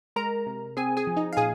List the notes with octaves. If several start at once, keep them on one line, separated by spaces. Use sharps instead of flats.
G#3 A#4 A#5
C3
C4 G#4 G#5
G#4 G#5
F3
D#4 D#5
F5
A#2 G#4 G#5